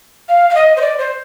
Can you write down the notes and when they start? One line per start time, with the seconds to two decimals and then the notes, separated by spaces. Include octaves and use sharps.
0.29 F5
0.50 F5
0.55 D#5
0.77 C5
0.81 D5
0.98 C5